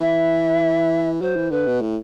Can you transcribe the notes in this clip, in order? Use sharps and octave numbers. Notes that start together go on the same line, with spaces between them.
E3 E5
F#3 C5
E3
D3 B4
B2
A2